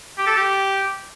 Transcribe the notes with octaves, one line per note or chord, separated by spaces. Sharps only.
G4
A4
G4